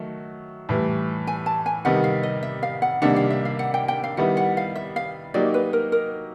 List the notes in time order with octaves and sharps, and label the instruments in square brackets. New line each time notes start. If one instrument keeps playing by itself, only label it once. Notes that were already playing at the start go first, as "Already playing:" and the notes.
Already playing: [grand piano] D#3 F#3 A3
A2 E3 G3
[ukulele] G#5
A5
G#5
[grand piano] C3 D#3 G3 B3 [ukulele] F#5
[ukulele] F5
D#5
E5
F5
F#5
[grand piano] C3 D#3 G3 A#3 D4 [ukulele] F#5
[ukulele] F5
E5
F5
F#5
G5
G5
F5
[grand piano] D#3 G3 B3 E4 [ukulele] F#5
[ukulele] F#5
F5
E5
F5
[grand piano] F#3 A#3 D#4 G4 [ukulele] D5
[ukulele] B4
A#4
A#4